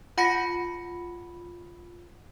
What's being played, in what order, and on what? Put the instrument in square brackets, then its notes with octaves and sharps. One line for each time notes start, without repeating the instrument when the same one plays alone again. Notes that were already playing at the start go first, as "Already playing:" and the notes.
[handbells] F4 F#5 B5 A#6 C#7